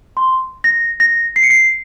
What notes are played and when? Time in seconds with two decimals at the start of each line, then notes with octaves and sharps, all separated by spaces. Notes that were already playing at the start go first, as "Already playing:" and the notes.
0.17 C6
0.64 A#6
1.00 A#6
1.36 C7
1.43 C#7
1.50 C7